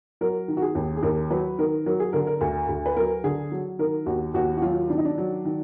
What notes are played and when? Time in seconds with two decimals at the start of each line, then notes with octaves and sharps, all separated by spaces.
0.21 F#3 A#4
0.48 D#3
0.57 F#4
0.62 G#4
0.75 D#2
0.97 G#4
1.03 D#2 A#4
1.30 F#3 B4
1.59 D#3 A#4
1.86 F#3 A#4
2.00 G#4
2.13 D3 A#4
2.27 A#4
2.41 D2
2.69 D2
2.86 B4
2.97 F#3 A#4
3.24 D3 G#4
3.51 F#3
3.79 D#3 A#4
4.06 D#2 F#4
4.34 D#2 F#4
4.57 F#4
4.62 F#3 F4
4.90 D#3 D4
4.98 D#4
5.05 D4
5.18 F#3
5.45 D#3